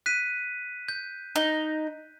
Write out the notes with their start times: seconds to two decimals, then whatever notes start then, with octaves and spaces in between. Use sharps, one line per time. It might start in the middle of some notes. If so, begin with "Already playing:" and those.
0.06 F#6 B6 D#7
0.89 G6
1.36 D#4